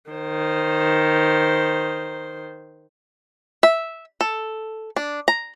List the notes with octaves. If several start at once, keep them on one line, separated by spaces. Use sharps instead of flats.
D#3 C5
E5
A4
D4
A#5